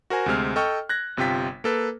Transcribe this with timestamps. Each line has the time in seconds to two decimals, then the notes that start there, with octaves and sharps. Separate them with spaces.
0.10 F#4 A#4 C5 G#5
0.26 D2 C3 G#3 C4 F6
0.56 A4 D#5 G5 C#6 F6
0.89 F#6 G#6 A#6
1.17 G1 C3 F4 G5 B6
1.64 A#3 A4 B4